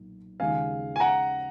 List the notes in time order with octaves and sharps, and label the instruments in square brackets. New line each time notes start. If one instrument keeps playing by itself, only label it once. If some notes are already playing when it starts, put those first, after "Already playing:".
Already playing: [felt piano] B1 A#2 D#4
[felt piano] D#2 C#3 F3 G#3 D#4 [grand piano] F5 G#5
[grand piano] G#5
F#5 A#5